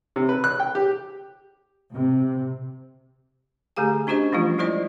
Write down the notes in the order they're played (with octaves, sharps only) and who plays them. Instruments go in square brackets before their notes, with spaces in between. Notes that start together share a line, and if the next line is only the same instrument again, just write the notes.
[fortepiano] C3
B4
F#6
G5
G4
[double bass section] C3
[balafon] D3 A3 G4 G#4 G#5
C#4 D4 F#4 G4 C5 D#5
E3 F3 G3 A3 C#4 F4
G3 G#3 E4 C5 D5 D#5